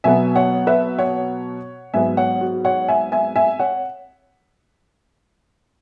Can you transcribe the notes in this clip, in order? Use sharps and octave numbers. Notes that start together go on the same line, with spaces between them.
B2 F#3 B3 E5 G#5
C#5 F#5
B4 E5
C#5 F#5
G#2 F#3 B3 E5 G#5
C#5 F#5
F#4
C#5 F#5
E5 G#5
E5 G#5
E5 G#5
C#5 F#5